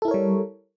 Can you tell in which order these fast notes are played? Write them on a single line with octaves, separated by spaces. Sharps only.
A4 E4 A#4 C#5 G3